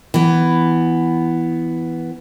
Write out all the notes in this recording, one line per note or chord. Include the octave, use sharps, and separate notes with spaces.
E3 B3